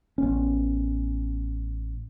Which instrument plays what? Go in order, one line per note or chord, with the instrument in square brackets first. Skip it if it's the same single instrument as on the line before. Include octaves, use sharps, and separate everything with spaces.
[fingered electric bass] A1 B3 C#4